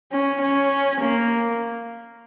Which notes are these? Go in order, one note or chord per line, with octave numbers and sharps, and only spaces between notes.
C#4
C#4
A#3